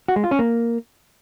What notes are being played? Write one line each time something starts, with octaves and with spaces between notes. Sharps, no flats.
F#4
G#3
F4
C#4
A#3